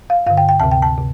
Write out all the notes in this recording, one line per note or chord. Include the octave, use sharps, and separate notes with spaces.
F5
G2 D3 F5
G5
G5
D2 C3 A5
G5
A5
C3